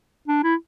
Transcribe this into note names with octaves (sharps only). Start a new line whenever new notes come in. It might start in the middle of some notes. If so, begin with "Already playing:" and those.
D4
E4